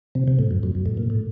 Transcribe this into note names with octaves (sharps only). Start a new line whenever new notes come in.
C3
C3
A2
F#2
F#2
F#2
A2
A#2
A2